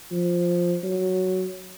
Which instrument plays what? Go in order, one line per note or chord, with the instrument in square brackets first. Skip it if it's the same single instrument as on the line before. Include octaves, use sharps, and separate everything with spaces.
[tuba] F3
F#3